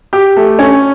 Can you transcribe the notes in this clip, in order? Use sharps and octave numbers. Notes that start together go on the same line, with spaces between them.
G4
A3
C#4